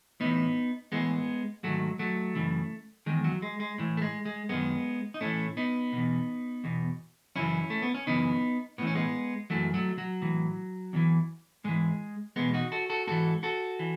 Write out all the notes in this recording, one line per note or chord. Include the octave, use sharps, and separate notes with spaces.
A2 E3 B3 D#4
A2 E3 G#3 B3
G#2 D#3 F#3 A3
F#3 A3
F#2 C#3 E3
E2 D#3 G#3
F#3
G#3
G#3
A2 E3
A3
G#3
G#3
F#2 D#3 G#3 B3
D#4
A2 E3 A3 C#4
B3 D#4
E2 B2
E2 B2
F#2 C#3 E3 C#4 E4
A3
B3
C#4
F#2 C#3 E3 B3 D#4
A2 E3 B3 C#4
G#3 B3
F#2 E3 F#3 A3
F#3 A3
F#3
A2 E3
E2 C#3 E3
G#2 E3 G#3
E2 B2 G#3 B3
D#4 F#4
F#4 A4
F#4 A4
G#2 E3 F#4 A4
F#4 A4
E3